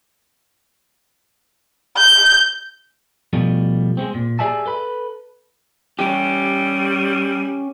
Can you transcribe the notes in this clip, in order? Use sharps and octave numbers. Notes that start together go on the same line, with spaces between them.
G6
B2 F3 G3 A3
G#3 A3 C4
A#2
G4 G#4 D5 E5 G#5 A5
A4 B4 B5
G3 C#4 G4